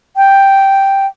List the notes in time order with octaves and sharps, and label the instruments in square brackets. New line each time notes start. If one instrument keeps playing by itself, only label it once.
[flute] G5